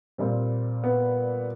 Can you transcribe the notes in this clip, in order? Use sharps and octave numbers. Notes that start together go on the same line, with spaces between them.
A#2 G3 C4
B3